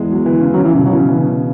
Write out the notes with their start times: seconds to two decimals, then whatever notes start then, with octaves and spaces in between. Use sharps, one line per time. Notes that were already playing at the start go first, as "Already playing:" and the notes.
Already playing: E2 G#3
0.11 F#3
0.26 E3
0.40 C#3
0.54 C#3 F#3
0.64 E3
0.75 F#2 B2
0.86 F#3
0.92 E3
0.96 C#3
1.09 E3
1.17 C#3